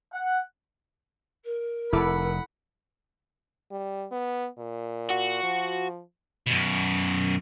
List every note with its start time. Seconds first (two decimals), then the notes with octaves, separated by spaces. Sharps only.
0.13 F#5
1.44 A#4
1.93 F1 E4 A4 F#5 B5 D6
3.71 G3
4.12 B3
4.58 A#2
5.10 F#4
5.43 F3
6.47 F#2 B2